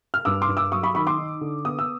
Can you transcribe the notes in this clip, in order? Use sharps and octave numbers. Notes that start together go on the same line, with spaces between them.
F6
G2 D6 E6
C6 D6
G2
D6 E6
F#3 C#6 D#6
B5 C#6
D#3 B5 C#6
C6 D6
D#4
D3
B3 D#6
E6